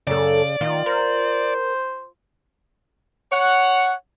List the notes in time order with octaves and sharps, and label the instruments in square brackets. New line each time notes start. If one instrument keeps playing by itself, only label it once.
[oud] F#2 A4 [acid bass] C#3 [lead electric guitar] D5
[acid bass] D#3 [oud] F4
[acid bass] A#4 [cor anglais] C5
[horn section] C#5 F#5